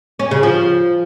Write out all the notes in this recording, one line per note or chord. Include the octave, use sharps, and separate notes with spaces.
C#4
C#3
F3